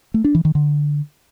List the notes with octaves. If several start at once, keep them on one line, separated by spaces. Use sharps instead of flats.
A3
D4
E3
D#3
D3